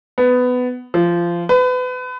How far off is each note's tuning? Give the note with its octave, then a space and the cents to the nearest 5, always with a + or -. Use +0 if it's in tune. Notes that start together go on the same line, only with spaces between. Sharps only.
B3 +15
F3 -20
B4 +30